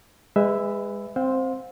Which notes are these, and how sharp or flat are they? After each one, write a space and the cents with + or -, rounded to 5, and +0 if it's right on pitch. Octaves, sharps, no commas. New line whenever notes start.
G#3 -25 B4 +15 E5 +0
C4 +5 C5 +0 F5 +40